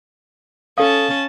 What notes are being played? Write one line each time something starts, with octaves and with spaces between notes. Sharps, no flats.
C#4 A4 F5 A5 D#6